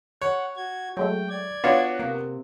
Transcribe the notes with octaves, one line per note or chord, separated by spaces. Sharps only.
C#5 F#5
F#4 G#6
F#3 G#3 A3 G5
D5 G#6
B3 D4 F4 F#4 C#5
C3 A#3